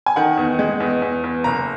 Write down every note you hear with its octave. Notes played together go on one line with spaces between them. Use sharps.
G#5
D#3 F#5
E2
G#3
E2
E2
E2
F#1 A#5